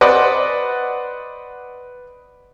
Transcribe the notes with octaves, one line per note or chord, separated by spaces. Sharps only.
B4 C5 D5 D#5 F#5